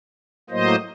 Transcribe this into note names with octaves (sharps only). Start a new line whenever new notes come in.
A2 F#3 A#3 C5 D#5